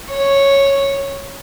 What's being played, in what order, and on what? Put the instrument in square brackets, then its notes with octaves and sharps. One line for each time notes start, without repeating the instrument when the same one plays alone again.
[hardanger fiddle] C#5